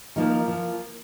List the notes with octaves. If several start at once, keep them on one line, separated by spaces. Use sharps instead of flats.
D3 D#3 F3 A#3 D#4
F3 F4